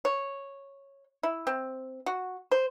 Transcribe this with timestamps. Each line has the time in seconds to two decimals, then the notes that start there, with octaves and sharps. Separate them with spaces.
0.05 C#5
1.23 E4
1.47 C4
2.06 F#4
2.51 C5